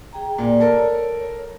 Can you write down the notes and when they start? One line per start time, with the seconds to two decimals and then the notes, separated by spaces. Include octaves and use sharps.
0.13 G#4 G5 A#5
0.38 A#2 D5
0.60 A4 A#4
0.78 C#5